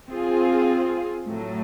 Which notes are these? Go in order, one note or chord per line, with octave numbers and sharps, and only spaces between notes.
C4 F4 G#4
A2 F#3 A3